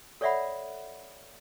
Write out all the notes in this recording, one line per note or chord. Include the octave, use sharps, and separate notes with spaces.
A4 C#5 D5 E5 F#5 B5